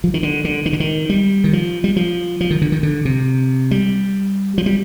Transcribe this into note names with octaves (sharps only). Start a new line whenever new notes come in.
F3
D#3
D3
D3
D#3
D3
D#3
G3
D#3
F3
G3
F3
F3
D#3
D3
D#3
D3
C3
G3
F3
G3